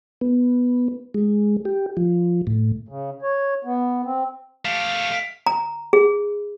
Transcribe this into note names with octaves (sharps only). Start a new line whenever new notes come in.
B3
G#3
G4
F3
A2
C#3
C#5
B3
C4
A3 G4 F5
A#5
G#4